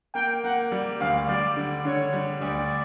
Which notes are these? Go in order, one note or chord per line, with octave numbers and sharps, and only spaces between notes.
A#3 G5
A#3 F#5
G3
D2 F5
G3 D5
D3
D3 C#5
G3
D2 D5